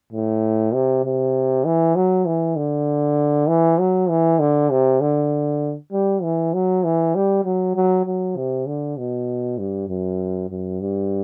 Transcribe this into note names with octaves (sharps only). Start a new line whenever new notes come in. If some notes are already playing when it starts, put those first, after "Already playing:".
A2
C3
C3
E3
F#3
E3
D3
E3
F#3
E3
D3
C3
D3
G3
E3
F#3
E3
G3
F#3
F#3
F#3
C3
D3
B2
G2
F#2
F#2
G2